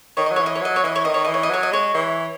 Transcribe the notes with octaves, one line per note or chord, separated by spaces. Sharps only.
D#3 C#5
D#5
F#3
E3 C#5
D#5
C#5
F#3 D#5
C#5
E3 D#5
C#5
D#3 D#5
C#5
E3 D#5
C#5
D#5
F#3 C#5
D#5
G#3 C#5
E3